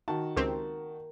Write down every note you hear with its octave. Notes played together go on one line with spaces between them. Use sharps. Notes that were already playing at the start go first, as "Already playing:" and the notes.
D#3 F#4 A5
C#2 C4 G4 A#4